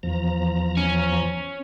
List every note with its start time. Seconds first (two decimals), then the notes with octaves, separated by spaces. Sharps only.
0.03 E2 F3 A#5
0.77 C#4